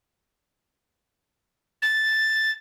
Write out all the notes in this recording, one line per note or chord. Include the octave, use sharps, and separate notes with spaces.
A6